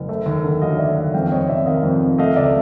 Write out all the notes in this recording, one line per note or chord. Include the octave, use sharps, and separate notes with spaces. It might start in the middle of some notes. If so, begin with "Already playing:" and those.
Already playing: F#1
A3
D#2
D3
F#3 D#5 F5
A3 D5 E5
D#2 E5 F#5
F2 F5 G5
F2 C#5 D#5
C3 D5 E5
D#3 D#5 F5
F2
F2
A3 D#5 F5
C#2 D5 E5